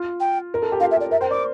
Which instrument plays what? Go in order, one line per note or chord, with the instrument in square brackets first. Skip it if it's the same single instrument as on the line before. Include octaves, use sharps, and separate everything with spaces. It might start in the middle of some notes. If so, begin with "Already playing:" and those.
Already playing: [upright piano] F4
[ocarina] G5
[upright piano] A#4
A4
G4
[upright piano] F4 [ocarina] F5
[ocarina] E5
[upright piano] G4 [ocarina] D5
[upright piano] A#4 [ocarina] E5
[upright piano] C5 [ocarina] G5
[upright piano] D5 [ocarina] D6